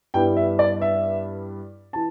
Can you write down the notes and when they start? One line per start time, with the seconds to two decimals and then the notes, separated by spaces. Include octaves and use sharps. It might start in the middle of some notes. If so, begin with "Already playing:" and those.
0.14 G2 G3 B3 E4 G5
0.37 E5
0.59 D5
0.82 E5
1.93 E3 A5